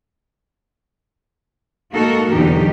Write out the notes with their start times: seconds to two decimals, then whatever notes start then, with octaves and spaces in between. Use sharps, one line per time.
1.92 G#3 A#3 D#4 F#4 A4 A#4
2.30 E2 B2 D3 F#3 D#4 G4